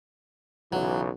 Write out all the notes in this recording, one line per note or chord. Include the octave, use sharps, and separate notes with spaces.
B1 C#3 E3 F#3